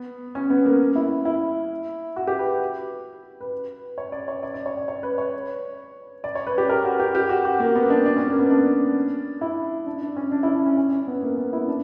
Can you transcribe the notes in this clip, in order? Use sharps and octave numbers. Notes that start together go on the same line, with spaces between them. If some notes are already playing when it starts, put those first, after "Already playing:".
Already playing: B3
C#4
B3
A#3
E4
E4
F#4
G4
B4
B4
C#5
D5
C#5
D5
D5
C#5
D5
C#5
B4
C#5
D5
C#5
B4
G4
A#4
F#4
G4
G4
F#4
F#4
A#3
B3
D4
D4
C#4
A#3
B3
D4
E4
D4
D4
C#4
D4
E4
D4
C#4
C#4
C#4
B3
A#3
B3
E4
D4